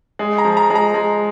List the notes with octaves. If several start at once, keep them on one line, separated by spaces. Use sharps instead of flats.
G#3
A#5
F3
A#5
G#3
A#5
G#3